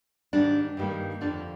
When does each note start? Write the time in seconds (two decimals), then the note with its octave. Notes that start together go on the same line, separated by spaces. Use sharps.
0.33 G#2 D#3 G3 D4
0.77 G2 D#3 G3 A#3
1.21 F2 D3 F3 D4